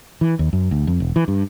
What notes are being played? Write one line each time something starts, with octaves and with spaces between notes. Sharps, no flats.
E3
D#2
F#2
D2
F2
E1
E3
G2